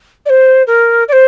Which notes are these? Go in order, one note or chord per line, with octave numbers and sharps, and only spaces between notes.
D5
C5
A#4
D5
C5